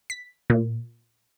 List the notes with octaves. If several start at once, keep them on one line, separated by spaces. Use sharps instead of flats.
B6
A#2